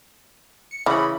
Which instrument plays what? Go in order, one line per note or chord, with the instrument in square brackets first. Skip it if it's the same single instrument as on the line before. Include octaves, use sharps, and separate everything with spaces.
[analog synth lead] C#7
[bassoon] C#3 [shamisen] E3 [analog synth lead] B5